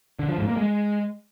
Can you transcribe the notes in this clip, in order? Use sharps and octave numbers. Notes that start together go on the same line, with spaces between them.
D3
F3
G#2
A#3
G#3